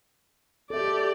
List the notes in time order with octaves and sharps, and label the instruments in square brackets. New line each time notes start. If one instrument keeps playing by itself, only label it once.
[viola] G4 D5 [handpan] A4 E5